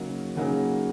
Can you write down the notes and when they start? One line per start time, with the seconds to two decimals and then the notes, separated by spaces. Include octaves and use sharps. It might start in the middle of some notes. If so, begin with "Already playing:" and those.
Already playing: C#3 F#3 A#3 D#4 G#4
0.35 C#3 F#3 A#3 D#4 G#4